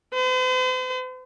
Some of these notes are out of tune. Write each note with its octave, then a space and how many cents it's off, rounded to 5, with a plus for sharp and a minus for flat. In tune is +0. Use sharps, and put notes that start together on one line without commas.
C5 -45